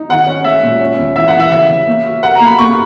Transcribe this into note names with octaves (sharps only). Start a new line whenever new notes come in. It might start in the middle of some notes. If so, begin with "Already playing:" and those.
Already playing: D#4
D#3 F#5
C#4
G#3 E5
A#2
C#4
D#2
E3 E5
F#5
E3
E5
C#3 E5
C#3
A#3
F#4
A#4 F#5
A#5
A#3
B5
A#3 C#6